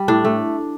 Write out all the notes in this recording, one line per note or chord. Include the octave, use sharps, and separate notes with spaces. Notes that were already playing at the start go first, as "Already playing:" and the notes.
Already playing: G3
A2 D4
A3